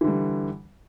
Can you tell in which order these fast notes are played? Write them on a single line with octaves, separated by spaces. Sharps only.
E3 D3 G3